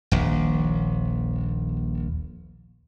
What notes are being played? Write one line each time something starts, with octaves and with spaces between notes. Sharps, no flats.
D#1 A#1